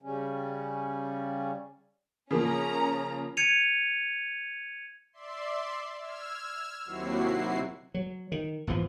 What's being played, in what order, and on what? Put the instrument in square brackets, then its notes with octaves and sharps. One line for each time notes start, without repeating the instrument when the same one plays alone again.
[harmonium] C#3 G3 C#4
[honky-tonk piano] C#3 F3 A#3 [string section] C#4 A#5
[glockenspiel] G#6 C#7 D#7 F7
[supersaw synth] D5 E5 C6
E6 F6 G#6
D#2 C3 F#3 E4 F#4 C7
[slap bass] F#3
D#3
G#1 E2 E3 F3